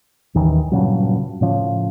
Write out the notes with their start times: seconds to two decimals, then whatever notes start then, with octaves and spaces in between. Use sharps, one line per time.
0.34 A1 D#2 D#3 E3
0.72 G2 A#2 C#3 F#3
1.41 A2 C#3 F3